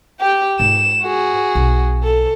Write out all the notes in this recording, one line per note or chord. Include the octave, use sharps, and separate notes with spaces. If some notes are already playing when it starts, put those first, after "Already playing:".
G4 G5
G#2 F4 E7
F#4 G#4
B1
A4